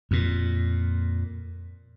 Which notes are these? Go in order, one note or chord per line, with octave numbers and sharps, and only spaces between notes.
F2 A#2